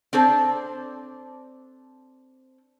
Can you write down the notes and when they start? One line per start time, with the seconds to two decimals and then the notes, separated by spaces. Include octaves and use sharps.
0.13 C4 D4 A4 C5